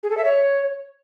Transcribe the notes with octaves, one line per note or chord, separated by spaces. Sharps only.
G#4
A4
E5
C#5